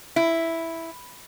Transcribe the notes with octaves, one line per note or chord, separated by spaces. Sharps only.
E4